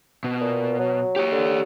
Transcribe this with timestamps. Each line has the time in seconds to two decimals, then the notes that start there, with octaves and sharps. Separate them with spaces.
0.24 B2
0.40 A#2
0.79 F#3
1.16 G4 C#5
1.32 D3